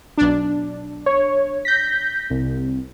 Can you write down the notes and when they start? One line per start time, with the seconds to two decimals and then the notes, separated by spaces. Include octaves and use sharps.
0.18 B1 D4
1.06 C#5
1.65 G6 A#6 B6
2.30 C2